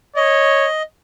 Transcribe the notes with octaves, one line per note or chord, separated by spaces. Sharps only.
C#5 D#5